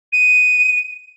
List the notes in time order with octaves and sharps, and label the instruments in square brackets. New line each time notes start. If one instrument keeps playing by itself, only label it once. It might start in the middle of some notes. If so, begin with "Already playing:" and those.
[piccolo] D#7